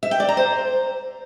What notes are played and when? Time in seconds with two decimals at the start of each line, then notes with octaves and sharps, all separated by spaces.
0.03 E5
0.11 G5
0.20 D5
0.29 A#5
0.37 C5